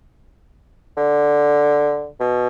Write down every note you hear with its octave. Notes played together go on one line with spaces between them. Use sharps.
D3
B2